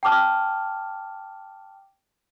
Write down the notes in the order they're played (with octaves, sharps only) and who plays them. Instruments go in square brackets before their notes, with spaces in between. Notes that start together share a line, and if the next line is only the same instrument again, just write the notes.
[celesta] G5 A5 D6 F6